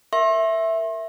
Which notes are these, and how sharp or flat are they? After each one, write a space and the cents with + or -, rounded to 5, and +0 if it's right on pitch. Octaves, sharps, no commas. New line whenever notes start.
A#4 -5 E5 +0 C6 +45